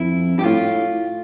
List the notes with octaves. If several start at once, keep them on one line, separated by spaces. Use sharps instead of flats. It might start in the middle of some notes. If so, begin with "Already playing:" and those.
Already playing: F2 E4
G2 G4
A2 F4